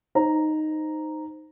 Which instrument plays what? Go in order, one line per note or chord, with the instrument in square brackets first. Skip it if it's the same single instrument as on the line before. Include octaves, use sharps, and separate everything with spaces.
[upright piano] D#4 C5 A#5